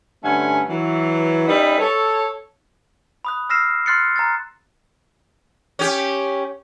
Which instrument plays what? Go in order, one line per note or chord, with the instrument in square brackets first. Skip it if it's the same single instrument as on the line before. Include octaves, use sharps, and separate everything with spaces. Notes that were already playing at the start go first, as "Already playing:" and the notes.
[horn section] G2 D3 A3 C#4 F#5 G#5
E3 F#3
G3 C#4 D#4 B4 E5 B5
A4 C#5
[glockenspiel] B5 D#6 F#6
E6 F6 A#6 C7 E7
C6 F6 F#6 A6 C7 C#7
A#5 F#6 A6
[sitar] C#4 G4